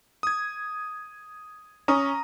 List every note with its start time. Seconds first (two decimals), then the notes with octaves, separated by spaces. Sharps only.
0.23 D#6 G#6
1.88 C#4 A#5 D#6